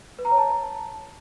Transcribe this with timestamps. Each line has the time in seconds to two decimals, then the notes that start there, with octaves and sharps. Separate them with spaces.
0.19 B4
0.25 A#5
0.31 C#5
0.37 A5